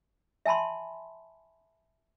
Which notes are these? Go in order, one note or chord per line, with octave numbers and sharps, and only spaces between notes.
E5 G#5 A5 B5 C6